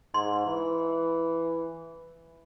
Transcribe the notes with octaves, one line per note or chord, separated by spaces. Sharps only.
G#2 C6
E3